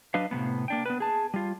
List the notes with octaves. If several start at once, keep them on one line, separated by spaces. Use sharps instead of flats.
F#3 D4 B4 D#5 F5
A2 C3 G#3 B3
A#3 D4 G5
B3 B4
G#4 A5
G3 F4